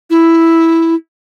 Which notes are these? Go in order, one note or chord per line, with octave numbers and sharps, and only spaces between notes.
E4